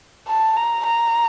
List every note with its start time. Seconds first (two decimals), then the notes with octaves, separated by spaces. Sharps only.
0.28 A5
0.57 A#5
0.86 A#5